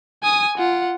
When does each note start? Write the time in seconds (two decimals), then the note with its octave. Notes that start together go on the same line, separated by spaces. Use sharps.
0.23 G#5 D#6
0.58 F4 F#5